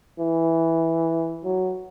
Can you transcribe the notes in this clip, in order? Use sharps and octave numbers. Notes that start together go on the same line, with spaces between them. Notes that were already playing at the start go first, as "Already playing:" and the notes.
E3
F#3